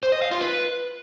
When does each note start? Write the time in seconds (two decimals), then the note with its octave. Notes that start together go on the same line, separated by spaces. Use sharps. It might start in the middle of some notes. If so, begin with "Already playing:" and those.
0.03 C5
0.12 D#5
0.22 F5
0.31 F4
0.41 B4